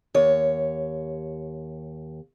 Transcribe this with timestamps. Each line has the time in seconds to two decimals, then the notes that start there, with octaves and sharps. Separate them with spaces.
0.14 D#2 C#5